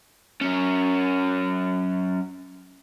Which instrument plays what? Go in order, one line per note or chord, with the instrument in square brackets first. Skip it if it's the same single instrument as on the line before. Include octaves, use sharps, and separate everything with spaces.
[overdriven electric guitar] F#3 C#4